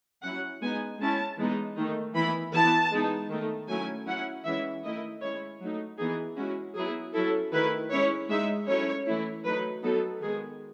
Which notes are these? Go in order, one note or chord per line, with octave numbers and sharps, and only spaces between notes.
F#3 C#4 E4 F#5
G#3 B3 D#4 G#5
G#3 C#4 E4 A5
E3 G#3 B3 D#4
D#3 A3 D#4
E3 B3 E4 B5
E3 B3 E4 A5
G#3 B3 D#4
D#3 A3 D#4
F#3 A3 C#4 E4 G#5
F#3 C#4 E4 F#5
E3 G#3 C#4 E4 E5
D#3 A3 E4 D#5
G#3 C#4 E4 C#5
F#3 A3 D#4
E3 B3 D#4 G#4
G#3 C#4 E4 F#4
F#3 B3 E4 G#4
F#3 C#4 E4 A4
D#3 A3 E4 B4
G#3 C#4 E4 C#5
G#3 D#4 E5
F#3 A3 C#4 E4 C#5
E3 A3 E4
F#3 A3 D#4 B4
F#3 B3 D#4 A4
D#3 G#3 B3 G#4